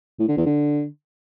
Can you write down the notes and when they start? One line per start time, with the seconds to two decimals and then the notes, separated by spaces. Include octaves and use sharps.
0.19 A2
0.28 D3
0.37 E2
0.46 D3